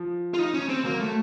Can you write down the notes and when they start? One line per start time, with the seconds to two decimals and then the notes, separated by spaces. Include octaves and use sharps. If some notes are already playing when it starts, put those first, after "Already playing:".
Already playing: F3
0.34 F4
0.39 D#4
0.54 C#4
0.69 C4
0.85 F#3 A#3
1.00 A3